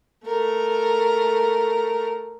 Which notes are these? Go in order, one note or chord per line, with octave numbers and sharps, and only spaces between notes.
A3 A#4